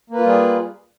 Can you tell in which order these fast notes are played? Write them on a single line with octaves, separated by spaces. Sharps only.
A#3 B4 F4 G3 G#4